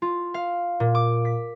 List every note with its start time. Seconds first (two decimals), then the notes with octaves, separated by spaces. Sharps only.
0.02 F4
0.34 F5
0.80 A#2
0.95 D6
1.25 B6